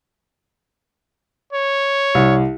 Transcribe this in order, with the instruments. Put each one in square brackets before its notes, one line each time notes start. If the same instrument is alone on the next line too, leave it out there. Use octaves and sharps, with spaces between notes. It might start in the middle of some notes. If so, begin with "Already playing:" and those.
[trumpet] C#5
[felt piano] C2